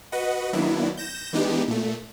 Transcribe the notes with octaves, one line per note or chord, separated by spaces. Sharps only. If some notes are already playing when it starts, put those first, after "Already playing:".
F#4 B4 D#5 F#5
D#3 F#3 A#3 B3 D4 E4
G6 A#6 E7
E3 G#3 B3 D4 D#4 G4
A#2 A3